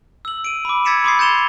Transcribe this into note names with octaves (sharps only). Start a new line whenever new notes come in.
E6 F#7
D7 D#7
B5 D6
E6 G#6 A6 B6 C#7 E7
B5 C6 D6 D#6 G#6 C7
G6 A6 C#7 E7 F7 G7